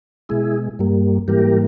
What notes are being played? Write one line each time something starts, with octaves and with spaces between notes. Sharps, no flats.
B2 G#3 E4 G#4
G2 G3 A#3
G#2 E3 G3 A#3 G4 A#4